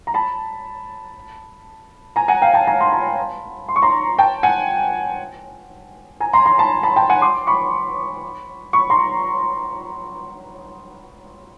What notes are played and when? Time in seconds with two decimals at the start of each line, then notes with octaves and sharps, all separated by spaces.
0.07 A#5
0.14 A5 B5
2.16 G#5 A#5
2.28 F#5 G#5
2.42 F5 G5
2.54 G5 A5
2.67 G#5 A#5
2.81 C6
2.92 A5 B5
3.69 C6
3.76 C#6
3.82 A#5 C6
4.19 G5 A5
4.43 F#5 G#5
6.20 G#5 A#5
6.33 A#5 C6
6.46 A#5 C6
6.58 A5 B5
6.83 A5 B5
6.96 G5 A5
7.09 F#5 G#5
7.22 C6 D6
7.47 B5 C#6
8.73 B5 C#6
8.90 A#5 C6